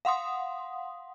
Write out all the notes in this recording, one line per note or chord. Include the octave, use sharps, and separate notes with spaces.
F5 F#5 C6 D#6